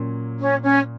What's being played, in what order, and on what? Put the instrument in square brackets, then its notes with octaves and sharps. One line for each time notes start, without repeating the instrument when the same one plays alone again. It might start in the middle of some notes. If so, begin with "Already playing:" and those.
Already playing: [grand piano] A#2 F#3 C#4
[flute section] C#4
C#4